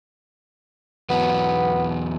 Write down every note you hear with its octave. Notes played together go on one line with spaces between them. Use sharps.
E2 F#3 B3